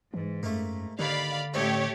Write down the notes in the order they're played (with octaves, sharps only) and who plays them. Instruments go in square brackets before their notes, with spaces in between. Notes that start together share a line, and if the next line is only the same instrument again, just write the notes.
[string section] G#2 [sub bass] E3
[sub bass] F#2 [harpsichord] A3 A#3
[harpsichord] D#2 [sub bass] D3 [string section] D5 F5 B5
[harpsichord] A1 C4 [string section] A3 G4 C#5